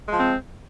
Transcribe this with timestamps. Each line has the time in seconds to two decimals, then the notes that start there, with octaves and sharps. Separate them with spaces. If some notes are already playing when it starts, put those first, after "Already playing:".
0.08 G#3
0.12 F3
0.17 C4